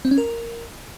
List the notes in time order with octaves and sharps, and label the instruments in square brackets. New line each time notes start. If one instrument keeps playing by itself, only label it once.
[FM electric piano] C4
C#4
A#4